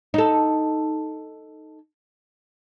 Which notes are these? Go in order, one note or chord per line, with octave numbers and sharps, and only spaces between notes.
D#4 A4